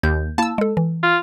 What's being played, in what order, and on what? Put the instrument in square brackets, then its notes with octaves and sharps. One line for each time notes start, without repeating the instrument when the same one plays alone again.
[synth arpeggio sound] D#2 [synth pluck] G6
[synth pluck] A#3 E4 [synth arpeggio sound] A5 E6
[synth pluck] G#3 A4
E3
[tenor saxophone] F4